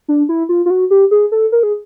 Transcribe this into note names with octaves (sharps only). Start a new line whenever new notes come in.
D4
E4
F4
F4
F#4
G4
G#4
A4
A#4
G#4